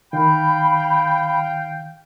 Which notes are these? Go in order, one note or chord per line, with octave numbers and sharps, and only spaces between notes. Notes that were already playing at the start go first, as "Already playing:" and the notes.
D#3 F5 G5 B5